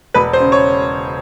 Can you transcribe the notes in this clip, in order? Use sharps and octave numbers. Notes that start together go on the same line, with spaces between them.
E1 B4
C5
C#3
C#5